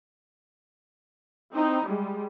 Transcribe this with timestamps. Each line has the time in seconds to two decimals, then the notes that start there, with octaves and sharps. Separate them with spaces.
1.53 C4 D#4 E4
1.85 G3 G#3